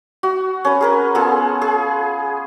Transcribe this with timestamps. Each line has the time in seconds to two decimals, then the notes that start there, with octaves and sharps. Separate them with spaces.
0.23 F#4
0.65 C#4 B4
0.81 G#4 A#4 B4
1.15 B3 F4 G#4 A4
1.62 G#4